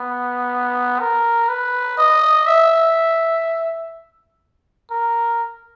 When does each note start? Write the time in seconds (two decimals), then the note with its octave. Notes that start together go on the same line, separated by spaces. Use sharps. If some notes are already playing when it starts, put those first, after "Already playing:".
Already playing: B3
1.00 A#4
1.49 B4
1.97 D#5
2.46 E5
4.91 A#4